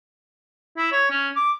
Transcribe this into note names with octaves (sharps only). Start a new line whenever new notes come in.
E4
C#5
C#4
D6